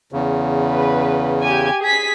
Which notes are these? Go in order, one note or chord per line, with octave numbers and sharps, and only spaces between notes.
E2 C#3
B4
G4 G#5
G#4 B6